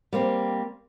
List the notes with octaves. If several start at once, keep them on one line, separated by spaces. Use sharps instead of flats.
G3 A#3 C4